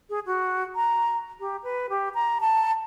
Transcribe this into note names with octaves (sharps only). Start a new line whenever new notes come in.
G#4
F#4
A#5
G4
B4
G4
A#5
A5